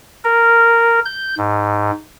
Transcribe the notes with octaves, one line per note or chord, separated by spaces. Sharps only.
A#4
G6
G#2